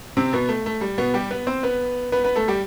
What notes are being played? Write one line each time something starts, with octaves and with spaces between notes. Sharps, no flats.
C3 C4
B2 B3
A3
A3
G3
B2 B3
G3 G4
B3 B4
C4 C5
B3 B4
B3 B4
B3 B4
A3 A4
G3 G4